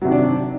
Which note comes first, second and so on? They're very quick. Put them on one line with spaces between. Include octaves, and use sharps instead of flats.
F#3 C3 D#3 D4